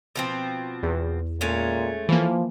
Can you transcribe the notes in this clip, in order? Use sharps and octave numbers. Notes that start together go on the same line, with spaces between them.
B2 F3 C4
E2
A#2 G#3 A3 C#4
E3 F3 A#3